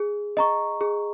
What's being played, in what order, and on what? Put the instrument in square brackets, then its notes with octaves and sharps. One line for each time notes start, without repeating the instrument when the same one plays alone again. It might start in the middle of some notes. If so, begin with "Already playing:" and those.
Already playing: [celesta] G#4
D#5 A#5 C#6
G#4